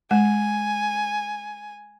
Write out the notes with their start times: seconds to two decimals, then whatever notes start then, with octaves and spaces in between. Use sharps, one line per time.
0.11 G#3 G#5